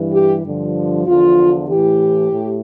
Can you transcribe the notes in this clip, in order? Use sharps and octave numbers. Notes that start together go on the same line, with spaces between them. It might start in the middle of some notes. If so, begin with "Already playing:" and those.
Already playing: G2 E3
G4
G2 D3 F3
E2 D3 F3 F4
A2 E3 G4
A2